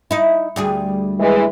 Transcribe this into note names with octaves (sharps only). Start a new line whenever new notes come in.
D#4 E4
D2 G3 G#4
E3 G#3